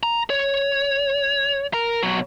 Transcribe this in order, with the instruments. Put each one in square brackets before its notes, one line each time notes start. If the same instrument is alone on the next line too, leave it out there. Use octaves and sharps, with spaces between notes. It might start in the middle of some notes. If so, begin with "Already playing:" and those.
[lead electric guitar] A#5
C#5
A#4
B2 F#3